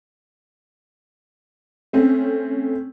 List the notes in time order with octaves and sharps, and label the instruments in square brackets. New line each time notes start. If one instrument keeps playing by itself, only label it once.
[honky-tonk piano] A3 C4 C#4